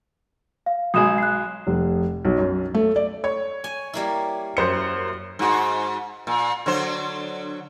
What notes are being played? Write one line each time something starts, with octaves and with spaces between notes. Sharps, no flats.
F5
B1 G#3 D#6 E7
F#6 C7
F1
B1
F#2
A3
D5
C#5
G#5
G3 A#3 E4
F#2 C5 C#7
G#2 F#4
A#2
D3 F#3 C5